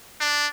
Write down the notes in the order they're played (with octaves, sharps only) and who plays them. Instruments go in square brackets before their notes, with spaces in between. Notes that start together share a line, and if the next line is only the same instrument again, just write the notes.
[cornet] D4